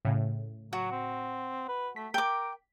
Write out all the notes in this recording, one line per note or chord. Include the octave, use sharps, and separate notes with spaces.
A2 C#3
F#3 F#4
C4
B4
A3 B6
A#4 G5 D6